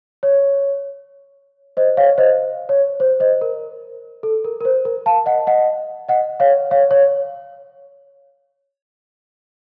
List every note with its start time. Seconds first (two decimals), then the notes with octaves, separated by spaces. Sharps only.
0.23 C#5
1.77 C5 D#5
1.97 C#5 F5
2.18 C5 D#5
2.69 C#5
3.00 C5
3.20 C5 D#5
3.41 A#4
4.23 A4
4.45 A#4
4.61 A#4
4.65 C5
4.85 A#4
5.06 F5 A5
5.26 D#5 F#5
5.47 D#5 F#5
6.09 D#5 F#5
6.40 C#5 F5
6.71 C#5 F5
6.91 C#5